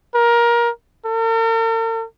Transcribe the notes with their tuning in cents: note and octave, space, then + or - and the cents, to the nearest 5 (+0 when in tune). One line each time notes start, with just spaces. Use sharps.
A#4 +20
A#4 -45